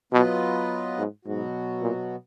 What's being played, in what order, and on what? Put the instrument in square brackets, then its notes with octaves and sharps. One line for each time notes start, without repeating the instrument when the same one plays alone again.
[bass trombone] B2 [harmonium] F#3 B3 F4 B4 D#5
[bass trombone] G#2
[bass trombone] G#2 [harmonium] B2 F#3 B3 F#4
[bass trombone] A#2